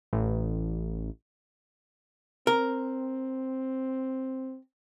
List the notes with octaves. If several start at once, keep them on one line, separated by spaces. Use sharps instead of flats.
A1
C4 A#4